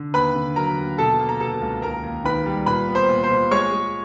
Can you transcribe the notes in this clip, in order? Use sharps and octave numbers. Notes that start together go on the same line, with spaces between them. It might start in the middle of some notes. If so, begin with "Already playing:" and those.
Already playing: D3
D#2 B4 B5
D3
F#3 A#4 A#5
D#2
B2 A4 A5
A#3
A#5
B2 A4 A5
C#2
D#2 A#4 A#5
D#2
D#3 B4 B5
G3
A#2 B4 B5
B3
C5 C6
A#2
C5 C6
A#2
G#3 C#5 C#6
G#3